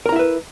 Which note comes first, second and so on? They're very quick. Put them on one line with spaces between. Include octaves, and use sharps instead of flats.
A#4 A#5 E4 E5 B4